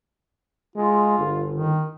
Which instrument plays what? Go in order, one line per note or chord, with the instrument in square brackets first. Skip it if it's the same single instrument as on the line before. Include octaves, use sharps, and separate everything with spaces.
[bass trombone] G#3 [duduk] F4
[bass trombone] G1
[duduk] D#3